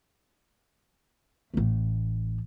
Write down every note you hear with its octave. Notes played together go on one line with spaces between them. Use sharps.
A1 A3